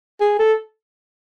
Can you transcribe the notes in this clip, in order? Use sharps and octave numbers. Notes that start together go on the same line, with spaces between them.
G#4
A4